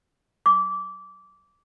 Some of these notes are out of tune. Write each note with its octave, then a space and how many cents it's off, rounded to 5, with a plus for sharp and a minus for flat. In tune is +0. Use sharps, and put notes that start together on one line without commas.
D6 -20